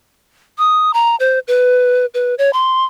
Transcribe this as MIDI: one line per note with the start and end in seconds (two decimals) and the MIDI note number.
0.58 0.93 87
0.94 1.16 82
1.20 1.39 72
1.48 2.06 71
2.14 2.35 71
2.38 2.51 73
2.53 2.85 84